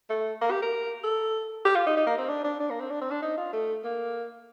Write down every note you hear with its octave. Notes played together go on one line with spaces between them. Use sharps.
A3
A#3
G4
A#4
A4
G4
F4
D#4
D#4
A#3
C4
D4
D4
D4
A#3
C4
D4
C4
D4
D#4
F4
A3
A#3